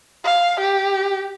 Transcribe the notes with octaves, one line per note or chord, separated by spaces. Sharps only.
F5
G4